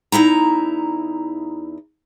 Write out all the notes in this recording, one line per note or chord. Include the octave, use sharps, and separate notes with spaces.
E2 D#4 E4 A#5